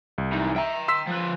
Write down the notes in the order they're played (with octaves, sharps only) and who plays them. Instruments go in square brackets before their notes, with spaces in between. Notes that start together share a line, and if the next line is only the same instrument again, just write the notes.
[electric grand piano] C2
[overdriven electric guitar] E3 D#4
[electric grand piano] E5 [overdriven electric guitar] G5 A#5
[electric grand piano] C6 E6 B6
[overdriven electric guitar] F3 B4